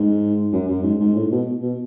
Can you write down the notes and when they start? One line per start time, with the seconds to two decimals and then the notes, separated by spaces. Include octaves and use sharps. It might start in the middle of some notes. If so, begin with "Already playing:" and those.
Already playing: G#2
0.53 F#2
0.68 F#2
0.83 G#2
1.00 G#2
1.15 A2
1.31 B2
1.62 B2